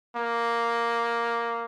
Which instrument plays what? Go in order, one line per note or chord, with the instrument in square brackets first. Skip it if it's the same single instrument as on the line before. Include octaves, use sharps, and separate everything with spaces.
[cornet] A#3